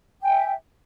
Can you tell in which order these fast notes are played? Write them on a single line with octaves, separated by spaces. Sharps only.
G5 G#5 E5